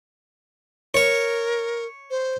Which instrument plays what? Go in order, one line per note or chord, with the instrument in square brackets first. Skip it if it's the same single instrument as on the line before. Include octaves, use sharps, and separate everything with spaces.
[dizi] A#4 [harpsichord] C#5
[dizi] C5